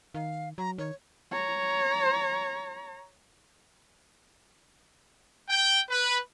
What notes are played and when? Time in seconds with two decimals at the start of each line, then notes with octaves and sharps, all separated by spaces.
0.15 D#3 F5
0.58 F#3 A#5
0.78 D#3 C#5
1.32 C#5 A#5
5.50 G5
5.90 B4